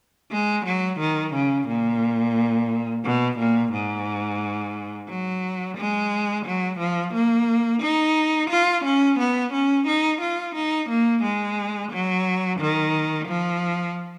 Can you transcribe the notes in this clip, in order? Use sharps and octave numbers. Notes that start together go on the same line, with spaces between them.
G#3
F#3
D#3
C#3
A#2
B2
A#2
G#2
F#3
G#3
F#3
F3
A#3
D#4
F4
C#4
B3
C#4
D#4
F4
D#4
A#3
G#3
F#3
D#3
F3